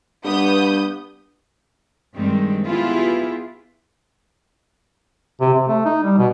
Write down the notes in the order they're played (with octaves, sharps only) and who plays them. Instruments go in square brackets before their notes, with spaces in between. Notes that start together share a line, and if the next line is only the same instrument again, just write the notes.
[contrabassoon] G2 [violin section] B3 D#6 G6
[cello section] G2 D#3 G3 G#3 C4
B3 E4 F4 G4 G#4 B4
[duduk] C3
C3
A3
D#4
G3
B2